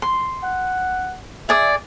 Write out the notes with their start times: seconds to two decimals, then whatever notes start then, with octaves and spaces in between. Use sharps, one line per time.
0.02 C6
0.44 F#5
1.49 G#4 D5 E5 D#6